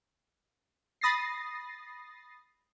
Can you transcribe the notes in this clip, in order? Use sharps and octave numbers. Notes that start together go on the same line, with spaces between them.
B5 D#6 A6 A#6 C7